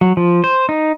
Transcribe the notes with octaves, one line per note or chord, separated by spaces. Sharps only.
F#3
F3
C5
D#4